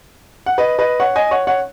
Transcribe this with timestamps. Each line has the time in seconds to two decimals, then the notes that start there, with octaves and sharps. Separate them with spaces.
0.46 F#5
0.58 B4 D#5
0.79 B4 D#5
1.00 C#5 F#5
1.16 D#5 G#5
1.31 C#5 F#5
1.47 C#5 F#5